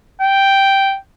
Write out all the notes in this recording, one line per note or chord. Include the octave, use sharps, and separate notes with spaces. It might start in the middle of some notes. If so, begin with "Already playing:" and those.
G5